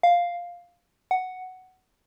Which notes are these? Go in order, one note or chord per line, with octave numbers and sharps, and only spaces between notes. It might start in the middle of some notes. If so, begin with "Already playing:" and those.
F5
F#5